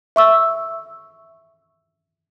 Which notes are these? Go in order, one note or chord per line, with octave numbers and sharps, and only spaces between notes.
E5 C#6 E6